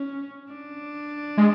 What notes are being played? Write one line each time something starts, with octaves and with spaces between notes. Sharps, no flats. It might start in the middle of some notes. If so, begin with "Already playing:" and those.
Already playing: C#4
D4
G#3